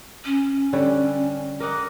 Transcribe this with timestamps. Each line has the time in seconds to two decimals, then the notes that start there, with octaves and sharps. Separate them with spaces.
0.24 C#4
0.73 D3 G3 C#5
1.60 A#4 D#5 F#5 D6